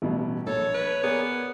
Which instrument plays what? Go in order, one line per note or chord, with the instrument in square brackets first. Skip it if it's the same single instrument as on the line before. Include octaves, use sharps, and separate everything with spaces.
[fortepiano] A1 B2 G3
[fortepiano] A#1 [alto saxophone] A4 [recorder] C#5
[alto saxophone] B4
[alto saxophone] B3 [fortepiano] G#4 A#4 D5